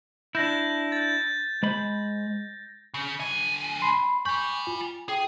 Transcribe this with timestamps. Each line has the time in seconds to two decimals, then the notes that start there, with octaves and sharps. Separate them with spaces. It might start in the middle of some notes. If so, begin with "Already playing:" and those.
0.35 D4 E4 G6 A#6
0.92 G6 A6
1.63 G#3 C5 B5
2.94 C#3
3.20 D3 G#5
3.82 B5 C6 C7
4.25 G5 G#5 B5 C#6 G6
4.67 F4
5.09 G#4 G5